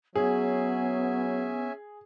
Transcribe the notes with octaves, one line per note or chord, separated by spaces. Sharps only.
F#3 B3 C#4 G#4 E5 G#5